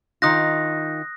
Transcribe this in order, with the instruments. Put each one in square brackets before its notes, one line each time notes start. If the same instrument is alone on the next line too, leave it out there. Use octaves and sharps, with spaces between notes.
[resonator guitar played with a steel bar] D#3 D#4 F4 [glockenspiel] D#6 F#6 A#6